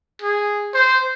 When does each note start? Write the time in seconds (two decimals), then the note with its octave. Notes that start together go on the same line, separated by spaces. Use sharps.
0.22 G#4
0.74 C5